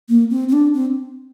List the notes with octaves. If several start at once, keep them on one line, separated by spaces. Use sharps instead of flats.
A#3
C4
C4
D4
C4